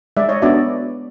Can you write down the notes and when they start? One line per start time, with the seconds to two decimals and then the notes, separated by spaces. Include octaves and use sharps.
0.17 G#3 D5 E5
0.29 C#5 D#5
0.42 B3 D4 F#4 D5 E5